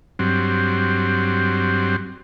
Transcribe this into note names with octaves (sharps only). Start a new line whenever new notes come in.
G2 F#3 C4